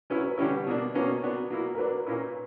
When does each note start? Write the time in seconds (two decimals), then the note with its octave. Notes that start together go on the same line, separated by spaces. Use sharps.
0.10 F#3 C#4 E4 B4
0.25 B4
0.38 D3 G3 C#4 E4 G4
0.67 B2 A#3 D4
0.94 B2 F#3 A#3 C#4 B4
1.23 F#3 B3 D4
1.50 F#3 A#3 E4
1.74 A#4
1.78 F#3 A#3 D4 B4
2.06 A#2 A#3 C#4 E4